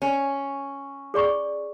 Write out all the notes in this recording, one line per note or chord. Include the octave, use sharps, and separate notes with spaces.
C#4
G#4 D5 C#6